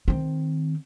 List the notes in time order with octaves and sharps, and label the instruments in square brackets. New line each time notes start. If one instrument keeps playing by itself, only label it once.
[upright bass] D#3 C4